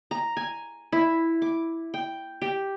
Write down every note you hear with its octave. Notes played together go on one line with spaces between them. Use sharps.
A#5
G#5
E4
D6
G5
G4